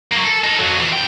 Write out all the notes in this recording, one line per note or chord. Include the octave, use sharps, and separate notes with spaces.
F#3 A#3
A4
D#4 A4
F2 F#3
E3 F4
C#3 G5